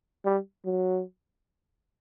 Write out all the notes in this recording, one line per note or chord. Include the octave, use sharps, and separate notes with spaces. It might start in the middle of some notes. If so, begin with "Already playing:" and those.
G3
F#3